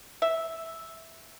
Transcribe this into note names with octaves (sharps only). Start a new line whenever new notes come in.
E5